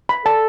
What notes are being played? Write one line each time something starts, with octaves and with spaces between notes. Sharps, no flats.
B5
A4 A5